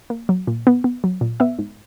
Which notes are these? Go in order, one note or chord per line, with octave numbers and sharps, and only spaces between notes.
A#3
F#3
A#2
B3
B3
F#3
A#2
B3 E5
G#2